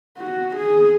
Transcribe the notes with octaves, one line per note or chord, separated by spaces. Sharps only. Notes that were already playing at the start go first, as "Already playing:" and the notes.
F#4
G#4